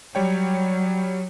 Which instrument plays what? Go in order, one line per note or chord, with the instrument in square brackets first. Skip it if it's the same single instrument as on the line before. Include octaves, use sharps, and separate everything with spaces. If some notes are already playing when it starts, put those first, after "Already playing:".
[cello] F#3 [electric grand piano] G3 C#5 G5